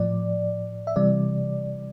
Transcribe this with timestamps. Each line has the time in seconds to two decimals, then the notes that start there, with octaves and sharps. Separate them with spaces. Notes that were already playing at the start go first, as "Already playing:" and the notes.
Already playing: A2 F3 D5
0.87 E5
0.96 C3 E3 G3 D5